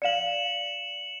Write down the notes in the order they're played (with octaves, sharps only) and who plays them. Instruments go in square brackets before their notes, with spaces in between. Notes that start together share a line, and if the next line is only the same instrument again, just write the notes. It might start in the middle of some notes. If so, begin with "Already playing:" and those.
[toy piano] D5 F5 [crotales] C#7 E7 F#7